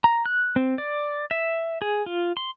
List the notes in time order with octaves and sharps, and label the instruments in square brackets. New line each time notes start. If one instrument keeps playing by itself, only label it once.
[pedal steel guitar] A#5
F#6
C4
D5
E5
G#4
F4
C6